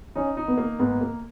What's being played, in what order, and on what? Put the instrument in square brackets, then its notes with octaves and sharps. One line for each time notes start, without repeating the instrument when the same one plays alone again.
[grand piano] C#4 [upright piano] D#4
[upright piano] D#4
[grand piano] B3
[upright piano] A#3
[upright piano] G#2 [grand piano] B3
[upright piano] A#3